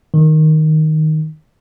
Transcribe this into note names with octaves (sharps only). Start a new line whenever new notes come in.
D#3